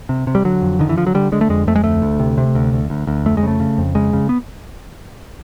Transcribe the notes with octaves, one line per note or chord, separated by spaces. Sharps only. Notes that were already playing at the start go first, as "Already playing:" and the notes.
C3
C3
G3
D3 F#3
F2
D3 D#3
E3
D3 F3
F#3
D3 G3
D3 G#3
A3
F2 G#3
F2 A3
G#3
D2 A3
D2
C3
C3
D2
D2
D2
D2
F2 A3
G#3
C#3 A3
C#3
F2
C#3 G#3
C#3
B3